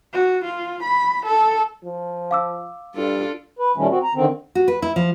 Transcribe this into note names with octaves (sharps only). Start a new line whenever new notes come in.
F#4
F4
B5
A4
F3
F5 D6 E6
G2 D4 F4 A4
B4
A#2 D#3 G3 A3 C#4
C4 F#4
A#5
D3 D#3 C4
F#4
B4
E4
F3